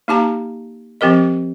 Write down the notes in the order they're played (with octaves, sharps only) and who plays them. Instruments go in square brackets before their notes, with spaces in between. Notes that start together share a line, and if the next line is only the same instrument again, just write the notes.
[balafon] A#3 D#4 G4 A5 A#5
F3 C4 G4 A#4 D#5